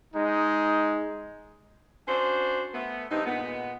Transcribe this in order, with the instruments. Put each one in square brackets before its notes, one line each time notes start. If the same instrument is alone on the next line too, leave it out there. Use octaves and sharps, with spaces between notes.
[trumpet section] G#3 D#4
[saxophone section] C#4 D4 F#4 C5
A3 B3
G2 G#3 C4 D#4
A#2 G#3 B3